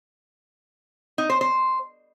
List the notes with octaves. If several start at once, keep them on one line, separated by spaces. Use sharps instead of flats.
D#4
C5
C5